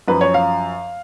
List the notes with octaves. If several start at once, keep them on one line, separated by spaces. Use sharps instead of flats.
F#2 F3 B4
C#5
F5